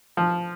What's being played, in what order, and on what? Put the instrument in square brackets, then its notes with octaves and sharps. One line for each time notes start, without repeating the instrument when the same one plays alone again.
[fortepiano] F3